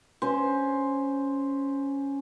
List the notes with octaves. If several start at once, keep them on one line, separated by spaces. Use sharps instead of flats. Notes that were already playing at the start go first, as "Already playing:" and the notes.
C#4 C5